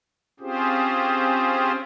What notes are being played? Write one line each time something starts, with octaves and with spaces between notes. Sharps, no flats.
C4 C#4 F4 G4 G#4 C5